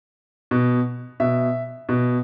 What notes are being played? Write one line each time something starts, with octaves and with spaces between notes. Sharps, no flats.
B2
B2 E5
B2